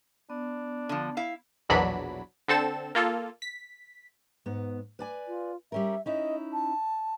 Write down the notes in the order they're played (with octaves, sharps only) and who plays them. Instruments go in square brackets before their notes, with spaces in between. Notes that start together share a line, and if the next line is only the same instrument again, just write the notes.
[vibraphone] B3 [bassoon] D4
[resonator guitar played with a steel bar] D3 F3
E4 F5
[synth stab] A#1 E2 B2 F#3 D4 B5
D3 C4 A4 E7
A#3 F4 A4
B6
[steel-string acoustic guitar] G#2 B3
B4 D5 G#5
[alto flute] F4
[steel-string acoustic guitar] G3 C#4 A#4 [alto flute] E5
[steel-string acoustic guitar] C#4 D#4 E4 [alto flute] D#5
[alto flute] A5